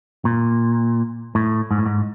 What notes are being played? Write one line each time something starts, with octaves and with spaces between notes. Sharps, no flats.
A#2
A2
G#2
A2
G#2